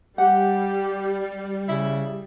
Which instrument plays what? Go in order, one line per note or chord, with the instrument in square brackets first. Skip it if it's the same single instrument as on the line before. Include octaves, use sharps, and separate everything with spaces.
[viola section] G3 [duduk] G4 [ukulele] F#5
[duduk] C#3 [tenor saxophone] E4